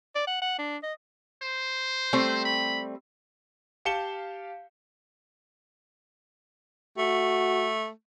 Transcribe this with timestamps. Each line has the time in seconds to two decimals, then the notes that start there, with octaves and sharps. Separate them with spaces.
0.15 D5
0.27 F#5
0.42 F#5
0.59 D4
0.83 D#5
1.43 C5
2.13 G3 A3 C4
2.45 B5
3.85 G4 F5 A5 C#7 E7 G7
6.98 A3 F#4